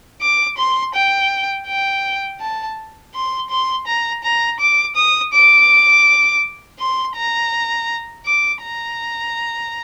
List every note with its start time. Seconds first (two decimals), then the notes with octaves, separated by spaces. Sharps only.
0.22 D6
0.58 C6
0.95 G5
1.68 G5
2.40 A5
3.14 C6
3.50 C6
3.87 A#5
4.24 A#5
4.60 D6
4.96 D#6
5.33 D6
6.79 C6
7.16 A#5
8.26 D6
8.62 A#5